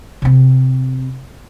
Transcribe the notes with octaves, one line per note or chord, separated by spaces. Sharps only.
C3 C4